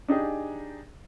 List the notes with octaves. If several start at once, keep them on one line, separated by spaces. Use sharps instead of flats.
D4 D#4 G4 G#4 G#5